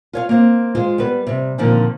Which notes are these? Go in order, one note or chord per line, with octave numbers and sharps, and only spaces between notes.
F4 C#5 F5
A#3 C4
G#3 F4 C5
G3 B3 B4
C3 G3
A#2 D3 D#3 F3 C4